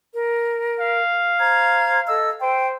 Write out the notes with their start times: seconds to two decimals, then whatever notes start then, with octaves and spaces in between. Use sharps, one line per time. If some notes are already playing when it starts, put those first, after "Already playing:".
0.14 A#4
0.80 F5
1.38 C5 A#5 G#6
2.07 A4 D#5 E6
2.42 C5 G5